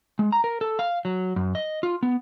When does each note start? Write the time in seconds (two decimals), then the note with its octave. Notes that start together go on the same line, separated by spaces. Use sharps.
0.19 G#3
0.32 A#5
0.44 A#4
0.61 A4
0.79 F5
1.05 F#3
1.36 F#2
1.55 D#5
1.83 F4
2.03 B3